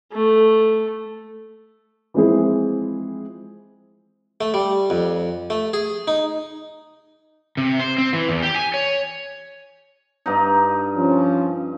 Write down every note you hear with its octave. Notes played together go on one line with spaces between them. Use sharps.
A3
E3 F3 G#3 C4 E4 G#4
A3
G3
F2
A3
G#4
D#4
C3
C5
C4
E3
E2
G4
G#5
C#5
G2 D#4
F3 C#4